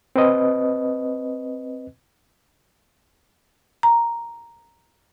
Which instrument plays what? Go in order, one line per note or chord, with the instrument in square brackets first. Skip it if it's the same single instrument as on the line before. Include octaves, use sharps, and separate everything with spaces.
[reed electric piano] C4 B4 D#5
[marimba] A#5